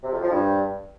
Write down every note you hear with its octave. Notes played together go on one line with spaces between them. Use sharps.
C3
F2
F3
G2